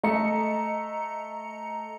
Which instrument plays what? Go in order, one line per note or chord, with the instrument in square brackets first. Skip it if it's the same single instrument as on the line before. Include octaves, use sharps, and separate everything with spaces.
[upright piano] A3 [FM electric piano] D#5 A#5 C#7